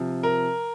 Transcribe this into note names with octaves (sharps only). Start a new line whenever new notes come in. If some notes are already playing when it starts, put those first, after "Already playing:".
Already playing: C3 F3
A#4